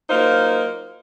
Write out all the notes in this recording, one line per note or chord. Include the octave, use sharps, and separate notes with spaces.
F#3 A#3 D#4 F4 A#4 C5